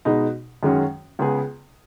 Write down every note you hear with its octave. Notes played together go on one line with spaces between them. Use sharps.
B2 G#3 D#4
F#2 D#3 G#3 C#4 F#4
C#2 C#3 B3 G#4